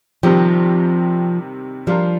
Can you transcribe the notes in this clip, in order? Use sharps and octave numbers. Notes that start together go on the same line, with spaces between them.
C3 D#3 F3 G3 C4 G4
F3 G3 D4 F4 A#4